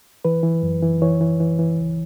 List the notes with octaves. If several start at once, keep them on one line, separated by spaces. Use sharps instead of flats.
E3 B4
E3
F#2
E3
E3 C#5
E3
E3
E3
C#2